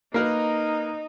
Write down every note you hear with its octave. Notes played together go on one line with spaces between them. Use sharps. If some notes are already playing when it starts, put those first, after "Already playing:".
A#3 D#4 A#4 B4